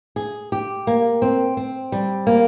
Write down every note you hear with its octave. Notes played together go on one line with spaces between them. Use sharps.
G#4
G4
A#3
C4
C4
G3
A#3